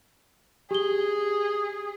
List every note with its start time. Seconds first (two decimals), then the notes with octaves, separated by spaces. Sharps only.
0.71 G4 G#4 G7